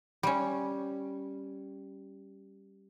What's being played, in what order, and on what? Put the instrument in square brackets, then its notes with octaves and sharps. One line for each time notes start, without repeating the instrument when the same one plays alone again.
[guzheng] G3 C#4